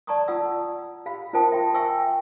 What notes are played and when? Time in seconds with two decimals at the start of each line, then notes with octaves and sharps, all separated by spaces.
0.07 D5 A5 A#5 C#6 D#6
0.28 F4 D5 F#5 D#6 E6
1.06 G4 F5 B5
1.33 F4 A#4 C5 G5 A5 D#6
1.52 E5 G5 C6
1.74 E5 G5 G#5 C#6 E6